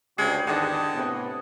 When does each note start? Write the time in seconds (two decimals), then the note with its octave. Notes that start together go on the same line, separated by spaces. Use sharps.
0.18 D2 G2 C#3 G#3 G4 G#4
0.47 E2 G#2 D3 D#3 D4 D#5 F#5
0.95 A2 C3 B3